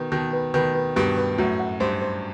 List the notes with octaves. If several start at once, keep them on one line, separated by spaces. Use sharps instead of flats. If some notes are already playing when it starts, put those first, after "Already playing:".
Already playing: B2 D#3 B4
B2 D#3 A5
B4
B2 D#3 B4
B4
G2 B2 B4
B4
F#2 A2 F#4
F#5
G2 C5
C5